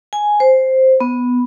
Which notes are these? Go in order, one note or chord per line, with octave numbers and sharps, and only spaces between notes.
G#5
C5
B3